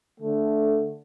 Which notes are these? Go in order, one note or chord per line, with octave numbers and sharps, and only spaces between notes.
D3 A3